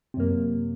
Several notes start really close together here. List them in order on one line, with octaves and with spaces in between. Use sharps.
C3 F#2 A#3